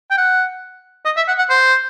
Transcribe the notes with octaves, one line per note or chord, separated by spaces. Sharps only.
G5
F#5
D#5
E5
F#5
F#5
C5